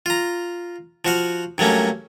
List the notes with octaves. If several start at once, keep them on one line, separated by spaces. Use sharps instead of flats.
F4 A#5
F3 F#4 F5
G2 F#3 A3 A#3 C#4